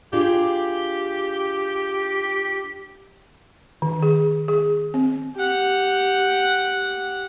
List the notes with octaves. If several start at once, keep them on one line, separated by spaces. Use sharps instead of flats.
D4 F4 G4 G#4
D#3
G#4
G#4
C4
G4 F#5